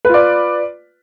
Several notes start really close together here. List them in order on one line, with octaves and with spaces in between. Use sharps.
B4 F4 D5